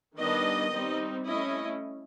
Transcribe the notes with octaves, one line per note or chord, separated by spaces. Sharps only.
D#3 G3 B3 D4 D#5
G3 C4 D#4
A3 C#4 E4 D#5